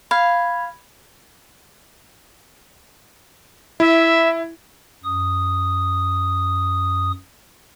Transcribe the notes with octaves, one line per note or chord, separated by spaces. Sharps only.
F5 B5 G#6
E4 E5
F#2 D#6